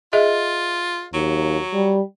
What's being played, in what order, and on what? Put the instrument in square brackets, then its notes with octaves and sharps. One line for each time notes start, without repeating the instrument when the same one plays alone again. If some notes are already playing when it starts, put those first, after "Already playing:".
[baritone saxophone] F4 [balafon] G#4 D#5 E5
[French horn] D#2 [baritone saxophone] F#3
[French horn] G3